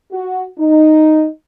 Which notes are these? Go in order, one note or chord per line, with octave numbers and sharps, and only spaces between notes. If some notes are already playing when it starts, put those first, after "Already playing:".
F#4
D#4